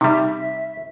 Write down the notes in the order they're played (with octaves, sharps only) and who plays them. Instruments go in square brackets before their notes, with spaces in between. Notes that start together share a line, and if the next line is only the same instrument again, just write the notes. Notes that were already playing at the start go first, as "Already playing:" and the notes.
[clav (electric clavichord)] C3 G3 [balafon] D#4 [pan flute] E5